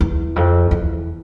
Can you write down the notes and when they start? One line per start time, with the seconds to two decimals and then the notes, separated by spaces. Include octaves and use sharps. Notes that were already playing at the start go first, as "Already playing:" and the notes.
0.01 E2
0.36 F2
0.71 E2